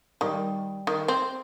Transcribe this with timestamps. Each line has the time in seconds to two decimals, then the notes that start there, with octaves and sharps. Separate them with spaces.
0.21 D#3 G3
0.87 D#3
1.08 C4